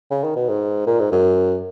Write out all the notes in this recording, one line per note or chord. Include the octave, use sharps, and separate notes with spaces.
C#3
D#3
B2
G#2
A#2
G#2
F#2